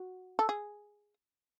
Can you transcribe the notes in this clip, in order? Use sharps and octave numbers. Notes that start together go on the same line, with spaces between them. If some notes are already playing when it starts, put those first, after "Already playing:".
Already playing: F#4
A4
G#4